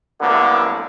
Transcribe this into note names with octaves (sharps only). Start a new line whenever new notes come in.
C2 F#2 A2 D3 A#3 B3